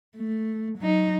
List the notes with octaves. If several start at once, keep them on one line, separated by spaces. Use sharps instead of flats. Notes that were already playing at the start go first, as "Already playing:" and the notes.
A3
F#3 D#4